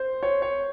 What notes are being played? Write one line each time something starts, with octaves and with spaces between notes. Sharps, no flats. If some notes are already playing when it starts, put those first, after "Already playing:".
Already playing: C5
C#5
C#5